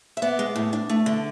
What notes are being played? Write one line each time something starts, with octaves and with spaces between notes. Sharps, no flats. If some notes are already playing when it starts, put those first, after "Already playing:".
E5
B3 D5
G#3
A2
D4
A3
D3